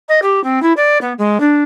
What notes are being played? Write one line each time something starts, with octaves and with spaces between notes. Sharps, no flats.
D#5
G4
C4
E4
D5
B3
G#3
D4